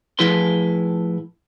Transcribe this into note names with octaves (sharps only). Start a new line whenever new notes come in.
A2 F3 E4 G#4 B4 C6